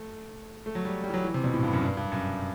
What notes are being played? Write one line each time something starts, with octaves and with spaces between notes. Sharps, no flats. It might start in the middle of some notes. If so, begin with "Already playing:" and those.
Already playing: A3
A3
F#3
G3
G3
E3
F#3
E3
C3
B2
A2
G2
F#2
G2
G2
F#2